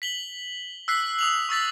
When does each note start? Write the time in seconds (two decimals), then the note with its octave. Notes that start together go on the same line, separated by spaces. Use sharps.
0.02 B6 F#7 G7
0.88 E6 F#6 B6 C7
1.19 D#6 F7 F#7
1.49 C#6 E6 A6 B6